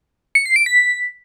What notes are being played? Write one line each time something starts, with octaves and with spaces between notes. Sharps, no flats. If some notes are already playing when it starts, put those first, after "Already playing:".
C#7
C7
D7
B6